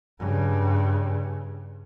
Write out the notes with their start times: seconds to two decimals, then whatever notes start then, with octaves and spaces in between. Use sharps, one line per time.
0.19 G2 C#3